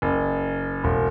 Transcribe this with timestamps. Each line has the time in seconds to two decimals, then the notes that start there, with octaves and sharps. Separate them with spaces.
0.02 F#1
0.84 E1